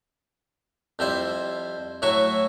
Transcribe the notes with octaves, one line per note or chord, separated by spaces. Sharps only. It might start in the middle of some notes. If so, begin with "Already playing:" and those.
F2 G3 E4 C5
A2 F#3 E4 F#4 E5 C#6